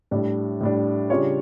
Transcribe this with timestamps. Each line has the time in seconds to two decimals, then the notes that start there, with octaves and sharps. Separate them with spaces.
0.11 A2 G3 D4
0.61 A2 G3 D4
1.10 C#3 G3 D4 F4 C#5